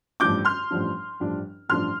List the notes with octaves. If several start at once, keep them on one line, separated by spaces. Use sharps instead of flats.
A1 G2 F3 D4 D6 G6
C6 F6
A1 G2 F3 D4
A1 G2 F3 D4
A1 G2 F3 D4 C6 F6